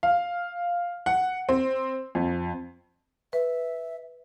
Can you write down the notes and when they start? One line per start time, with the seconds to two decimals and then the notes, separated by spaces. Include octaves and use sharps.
0.03 F5
1.06 F#5
1.49 C4
2.15 F2
3.33 B4 E5